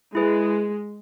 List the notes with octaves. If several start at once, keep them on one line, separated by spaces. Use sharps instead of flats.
G#3 E4 G#4 B4